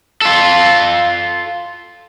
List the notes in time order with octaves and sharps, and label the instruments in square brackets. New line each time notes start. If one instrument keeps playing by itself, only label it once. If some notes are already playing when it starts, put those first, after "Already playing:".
[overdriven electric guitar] F4 A4